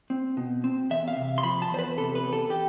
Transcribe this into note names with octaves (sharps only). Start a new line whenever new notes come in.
C4
B2
C4
E2 E5
F5
C3
C6
F3 B5
A5
E2 C5
B4
C3 A4
B4
E2
A4
G4